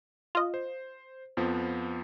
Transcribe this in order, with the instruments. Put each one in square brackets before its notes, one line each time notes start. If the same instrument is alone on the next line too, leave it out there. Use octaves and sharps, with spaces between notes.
[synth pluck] F4 D#5
[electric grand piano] C5
F2 F3 B3